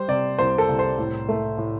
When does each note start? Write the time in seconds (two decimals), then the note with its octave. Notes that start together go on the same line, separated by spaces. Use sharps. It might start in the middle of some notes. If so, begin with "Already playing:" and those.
Already playing: G3 C5
0.08 C3 D5
0.38 C2 C5
0.58 A4
0.69 C2
0.79 C5
0.98 A2
1.29 A3
1.58 A2